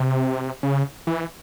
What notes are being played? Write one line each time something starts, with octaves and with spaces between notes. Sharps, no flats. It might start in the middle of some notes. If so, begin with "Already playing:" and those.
Already playing: C3
C#3
E3